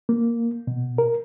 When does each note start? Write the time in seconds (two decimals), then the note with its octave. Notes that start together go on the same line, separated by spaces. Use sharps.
0.09 A#3
0.67 B2
0.98 A#4